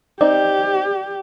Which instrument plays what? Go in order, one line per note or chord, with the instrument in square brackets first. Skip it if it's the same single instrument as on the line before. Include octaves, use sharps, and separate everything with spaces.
[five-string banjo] C4 D#4 [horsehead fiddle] G4 [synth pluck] D5